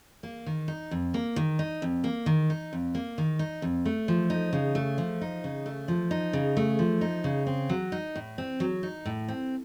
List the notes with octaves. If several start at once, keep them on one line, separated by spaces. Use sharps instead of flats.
A#3
D#3
D#4
F2
A#3
D#3
D#4
F2
A#3
D#3
D#4
F2
A#3
D#3
D#4
F2
A3
F3
D#4
C#3
A3
F3
D#4
C#3
A3
F3
D#4
C#3
A3
F3
D#4
C#3
C4
F#3
D#4
A2
C4
F#3
D#4
A2
C4